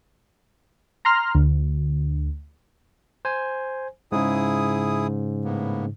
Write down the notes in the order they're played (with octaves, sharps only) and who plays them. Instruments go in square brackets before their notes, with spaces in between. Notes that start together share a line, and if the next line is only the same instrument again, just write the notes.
[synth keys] A#5 C6 F6
D2
[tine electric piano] C5 G#5
[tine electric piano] G#2 C#3 [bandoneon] E4 G#4 D#6
[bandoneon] A2 A#3 B3